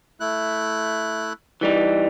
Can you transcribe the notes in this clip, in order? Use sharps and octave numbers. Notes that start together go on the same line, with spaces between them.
A3 E4 F#6
E3 G3 D#4